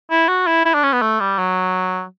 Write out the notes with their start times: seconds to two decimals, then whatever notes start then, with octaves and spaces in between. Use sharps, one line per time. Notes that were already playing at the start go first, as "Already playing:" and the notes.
0.11 E4
0.28 F#4
0.47 E4
0.65 E4
0.74 D4
0.83 C#4
0.93 B3
1.02 A3
1.20 G3
1.38 F#3